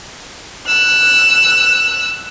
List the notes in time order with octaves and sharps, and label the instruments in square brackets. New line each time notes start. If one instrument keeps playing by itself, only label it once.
[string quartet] E6 F#6